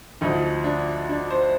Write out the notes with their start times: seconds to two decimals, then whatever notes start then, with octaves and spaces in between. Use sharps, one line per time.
0.21 D2 D3 F3 D#4
0.64 D4
1.09 D4
1.30 C5